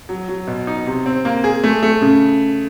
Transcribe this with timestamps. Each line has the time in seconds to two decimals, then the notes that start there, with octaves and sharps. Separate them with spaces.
0.09 F#3
0.29 F#3
0.47 B2
0.67 D#4
0.87 C3
1.06 C4
1.25 A#3
1.44 G#4
1.64 A3
1.83 A3
2.02 C#3